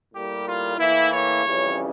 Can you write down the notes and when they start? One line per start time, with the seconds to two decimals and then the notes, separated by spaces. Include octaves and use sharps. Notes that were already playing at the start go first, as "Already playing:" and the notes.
0.14 A2 G3 A#3 G4
0.46 F4
0.78 A2 E3 A#3 E4
1.12 C#5
1.43 F2 C#3 E3 G3 C#4